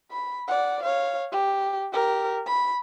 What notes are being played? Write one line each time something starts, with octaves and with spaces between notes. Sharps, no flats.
B5
D5 F#5
C#5 F5
G4
G4 A#4
B5